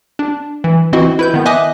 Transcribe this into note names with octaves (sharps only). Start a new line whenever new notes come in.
D4
E3
E3 C4 E4 F#4 D#5
E4 B4 G6
D#3 B3
D#5 E5 G#5 D6 D#6 F#6